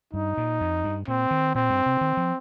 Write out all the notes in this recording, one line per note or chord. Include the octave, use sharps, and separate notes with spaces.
G2 D#4
A#2
F2
G2
A#2 C4
D#3
A#2 C4
G2
C3
D#3
F3